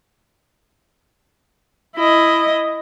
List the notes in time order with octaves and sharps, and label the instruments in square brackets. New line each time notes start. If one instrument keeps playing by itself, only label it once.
[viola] E4 D#5